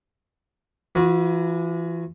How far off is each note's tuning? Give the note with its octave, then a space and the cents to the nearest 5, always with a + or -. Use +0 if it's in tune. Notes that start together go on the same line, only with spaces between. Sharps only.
E3 +35 F#4 -35 B4 -35